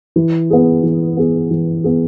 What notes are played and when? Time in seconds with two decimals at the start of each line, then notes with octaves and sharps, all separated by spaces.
0.16 E3
0.50 B3 G#4
0.83 E3
1.17 B3 G#4
1.51 E3
1.84 B3 G#4